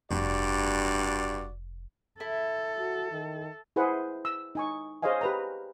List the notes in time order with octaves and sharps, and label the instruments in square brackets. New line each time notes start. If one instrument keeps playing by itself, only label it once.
[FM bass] F1 [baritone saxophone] G2 [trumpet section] F#4 D5
[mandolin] E4 [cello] A4
[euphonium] F#4
D#3
[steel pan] E4 G#4 B4 C5 F#5
E6
D#4 G#5 C#6
G#4 C5 C#5 D#5 F5 G#5
G4 B4 A#5